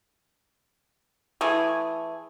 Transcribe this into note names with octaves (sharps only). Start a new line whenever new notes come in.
E3 A3 G#4